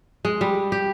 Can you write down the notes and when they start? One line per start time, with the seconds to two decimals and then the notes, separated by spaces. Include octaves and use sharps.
0.25 G#3
0.41 G3
0.72 G4